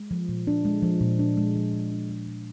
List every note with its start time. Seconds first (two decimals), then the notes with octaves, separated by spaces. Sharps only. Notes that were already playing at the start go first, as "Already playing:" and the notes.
Already playing: G#3
0.11 F3
0.29 A#2
0.47 D4
0.65 G#3
0.82 F3
1.01 A#2
1.19 D4
1.37 G#3
1.55 F3
1.73 A#2
1.92 D4
2.10 G#3
2.28 F3